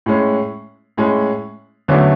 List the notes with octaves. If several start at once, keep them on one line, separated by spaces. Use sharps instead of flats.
A2 G#3 C#4
A2 G#3 C#4
E2 D3 F#3 A3 C#4